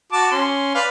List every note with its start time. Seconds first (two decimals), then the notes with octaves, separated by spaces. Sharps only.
0.12 F#4 A5 D6
0.32 C#4 C6
0.75 B4 D5 F5